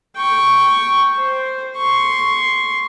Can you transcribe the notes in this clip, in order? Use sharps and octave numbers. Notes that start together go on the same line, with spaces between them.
G5 C#6
C5
C6 C#6